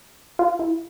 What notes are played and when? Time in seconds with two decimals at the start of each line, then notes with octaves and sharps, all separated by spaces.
0.39 F4
0.59 E4